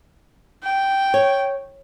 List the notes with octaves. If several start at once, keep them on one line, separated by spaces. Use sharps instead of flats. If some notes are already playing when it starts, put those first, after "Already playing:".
G5
C#5